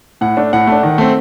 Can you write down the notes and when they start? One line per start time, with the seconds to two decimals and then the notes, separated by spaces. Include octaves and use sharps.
0.21 A2 F#5
0.37 A3 D4
0.53 A2 F#5
0.67 A3
0.72 D4
0.83 D#3
0.98 A3 C4